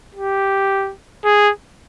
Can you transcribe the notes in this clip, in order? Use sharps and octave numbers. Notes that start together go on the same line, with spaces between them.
G4
G#4